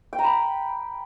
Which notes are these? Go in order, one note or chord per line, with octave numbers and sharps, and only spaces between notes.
G5
A#5
B5